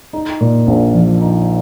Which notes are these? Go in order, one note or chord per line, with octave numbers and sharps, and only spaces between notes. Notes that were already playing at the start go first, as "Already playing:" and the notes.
D#4
A#2
A#1
F3
D#4